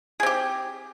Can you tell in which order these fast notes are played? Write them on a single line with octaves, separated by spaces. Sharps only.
G#4 C4 G4